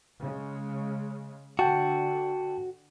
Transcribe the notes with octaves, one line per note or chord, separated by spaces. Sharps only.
C#3 G#3
D3 F#4 G5 A5